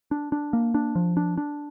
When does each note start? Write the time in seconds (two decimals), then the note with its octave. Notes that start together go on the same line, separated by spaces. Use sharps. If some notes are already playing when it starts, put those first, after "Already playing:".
0.11 D4
0.32 D4
0.53 A#3
0.74 D4
0.95 F3
1.17 D4
1.37 D4